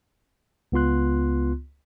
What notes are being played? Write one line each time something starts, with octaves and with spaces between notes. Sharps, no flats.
C#2 B3 F4 C6 F#6